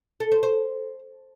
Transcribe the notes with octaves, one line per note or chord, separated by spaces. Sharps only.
A4
C5
C5